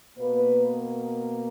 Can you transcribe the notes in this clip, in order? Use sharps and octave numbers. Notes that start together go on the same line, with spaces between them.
B2 A#3 B4
A#4